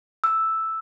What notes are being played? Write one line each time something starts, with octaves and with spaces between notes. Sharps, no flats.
E6